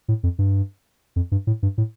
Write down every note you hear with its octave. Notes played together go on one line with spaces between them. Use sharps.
A2
F2
G2
F2
G2
A2
G2
A2